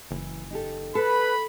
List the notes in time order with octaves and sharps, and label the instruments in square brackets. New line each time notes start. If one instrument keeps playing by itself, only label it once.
[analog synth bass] F#1 [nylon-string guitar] E3
[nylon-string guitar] D#4 G4 A4
[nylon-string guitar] A4 [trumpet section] B4 [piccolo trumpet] B5